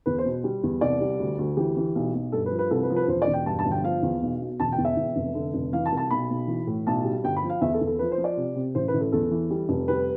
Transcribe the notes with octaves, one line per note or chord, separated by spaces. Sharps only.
E2 B4
C5
B2
G3
E2
C2 D5
G3
D2
D2
E3 G4
E3
B1
B1
G2 A4
B4
F3
B4
C2 A4
B4
F3
B4
E1 C5
D5
E1
G5
G2 A5
A5
G1
G5
F3 F5
E2
B1
B2
E1 A5
G5
E2
E5
E2
F1
D3
F1
E3 F5
A5
C2
A5
B1 B5
B1
E3
A2
B1 A5
G3
G1 G5
B5
F3
F5
E2 E5
A4
E2
A4
F3 B4
C5
F3
D5
C3
C3
A1 C5
B4
A1
A4
E2 A4
E3
G3
F1
G3 B4